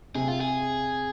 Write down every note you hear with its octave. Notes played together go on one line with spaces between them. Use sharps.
C3 G#4
F4
G#4